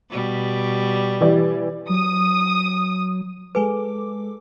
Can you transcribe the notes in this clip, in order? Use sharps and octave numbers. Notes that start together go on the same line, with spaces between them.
B2 G3
E3 G4 D5
F#3 D#6
G#3 A4 B4 G#5 D6